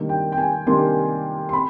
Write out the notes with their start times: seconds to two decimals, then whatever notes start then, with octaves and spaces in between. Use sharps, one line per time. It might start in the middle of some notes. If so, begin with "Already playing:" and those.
Already playing: C3 D#3 G3 A#3 D4
0.09 G5
0.32 G5
0.38 G#5
0.67 C3 D#3 G3 A#3 D4 C6
1.49 C6
1.53 B5